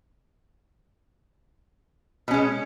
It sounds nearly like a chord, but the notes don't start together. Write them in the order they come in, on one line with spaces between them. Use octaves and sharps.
B2 C#4 G#3